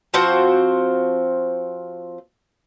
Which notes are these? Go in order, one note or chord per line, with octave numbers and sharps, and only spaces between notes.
F3 C4 F#4 C5